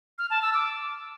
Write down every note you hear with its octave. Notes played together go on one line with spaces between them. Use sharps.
F6
A5
E6
D6